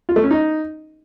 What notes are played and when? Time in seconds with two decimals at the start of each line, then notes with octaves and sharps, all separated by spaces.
0.09 F4
0.16 A3
0.23 C#4
0.31 D#4